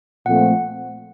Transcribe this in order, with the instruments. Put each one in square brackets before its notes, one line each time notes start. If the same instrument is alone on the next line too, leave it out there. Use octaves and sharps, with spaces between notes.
[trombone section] A#2 F3 A3 C4 [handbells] F#5